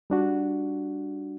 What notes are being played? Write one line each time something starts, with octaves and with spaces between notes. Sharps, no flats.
G3 D4 F#4